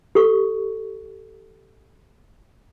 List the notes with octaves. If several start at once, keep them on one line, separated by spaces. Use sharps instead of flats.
G4 A4 C#6